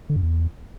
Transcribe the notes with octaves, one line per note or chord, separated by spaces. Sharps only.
D3
F#2
E2